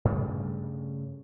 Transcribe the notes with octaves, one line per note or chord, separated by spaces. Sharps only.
G2 C#3 G3 A3